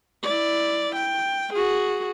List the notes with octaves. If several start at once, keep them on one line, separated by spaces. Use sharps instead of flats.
E4 D5
G5
F#4 G#4